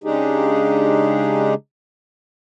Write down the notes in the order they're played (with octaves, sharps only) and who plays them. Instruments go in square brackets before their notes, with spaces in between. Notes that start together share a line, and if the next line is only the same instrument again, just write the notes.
[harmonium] C#3 G#3 D4 D#4 G4 G#4